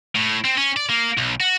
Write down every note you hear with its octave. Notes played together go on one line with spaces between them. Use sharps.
A2
C4
C#4
D5
A#3
B1
F#4